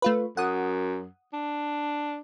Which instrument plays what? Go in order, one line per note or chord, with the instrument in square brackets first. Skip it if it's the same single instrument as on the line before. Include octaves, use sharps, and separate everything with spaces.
[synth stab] A3 F4 B4
[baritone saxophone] F#2 [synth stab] F#5 D#6
[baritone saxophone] D4